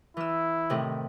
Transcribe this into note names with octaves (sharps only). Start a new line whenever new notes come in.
E3 E4 E6
A2 C3 D#3